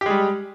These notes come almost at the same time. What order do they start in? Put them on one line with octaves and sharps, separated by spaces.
G4 G#3 G3